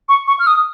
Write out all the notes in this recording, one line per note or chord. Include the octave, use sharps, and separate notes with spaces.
C#6
C#6
F6
D#6